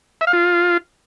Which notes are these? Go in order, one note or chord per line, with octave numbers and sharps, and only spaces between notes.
E5
F5
F4